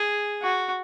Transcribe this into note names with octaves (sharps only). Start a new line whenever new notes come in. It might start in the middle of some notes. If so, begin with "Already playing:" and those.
Already playing: G#4
F#4